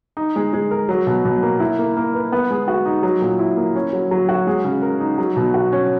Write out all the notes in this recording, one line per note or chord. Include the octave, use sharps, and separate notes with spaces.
D#4
G#3
G#3
A#4
F#3
B2
B2
A#3
E4
A#3
A#3
B4
B3
G#3
F#4
D#4
F#3
A#2
E4
A#3
C#4
F#3
F#3
F#4
G#3
C#3
A#4
D#4
F#3
B2
F#4
C#4